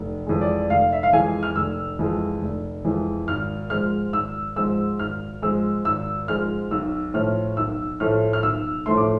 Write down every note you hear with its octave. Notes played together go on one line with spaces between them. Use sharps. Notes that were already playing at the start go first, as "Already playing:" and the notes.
Already playing: F1
F2 E3 G#3
D5
F1 F5
E5
F5
F2 E3 G#3 G#5
F6
F1 E6
F2 E3 G#3
F1
F2 E3 G#3
G#1 F6
G#2 F3 G#3 F6
G#1 E6
G#2 F3 G#3 E6
G#1 F6
G#2 F3 G#3 E6
G#1 E6
G#2 F3 G#3 F6
B1 E6
A2 F3 A3 F6
B1 E6
A2 F3 A3 F6
F6
B1 E6
A2 F3 A3 C6
D6